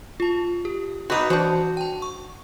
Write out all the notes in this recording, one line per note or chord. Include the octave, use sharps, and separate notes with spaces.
F4 A5
G4
B3 D#4 F#4 B4 C6 D6 D#6
E3 D4 F#4 C5
G5 A5
C#6